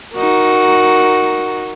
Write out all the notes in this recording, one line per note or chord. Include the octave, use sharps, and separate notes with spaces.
D#4 F#4 A#4